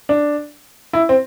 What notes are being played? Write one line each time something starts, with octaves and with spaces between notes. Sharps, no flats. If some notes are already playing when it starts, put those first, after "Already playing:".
D4
E4
C4